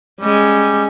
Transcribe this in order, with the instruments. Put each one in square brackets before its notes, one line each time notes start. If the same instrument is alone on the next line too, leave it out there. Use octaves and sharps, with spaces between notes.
[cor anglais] G3 [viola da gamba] G#3 C#4